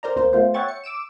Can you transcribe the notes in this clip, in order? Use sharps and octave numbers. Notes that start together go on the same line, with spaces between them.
A#4 C5 D5 A#5
D2 A#3 C5
A3 B3 F4 C5
C#5 E5 F#5 G5 C#6 A6
C#7
D6 E6 D7 E7